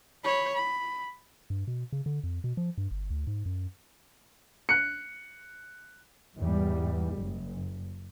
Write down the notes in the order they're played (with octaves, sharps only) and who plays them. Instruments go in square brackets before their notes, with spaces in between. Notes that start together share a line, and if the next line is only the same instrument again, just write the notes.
[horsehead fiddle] C#5 B5
B5
[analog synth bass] G2
B2
C#3
D3
F2
B2
F3
G2
G1
D2
G#2
F#2
[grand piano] F#6 C#7
[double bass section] E2 G#2 G3
F#1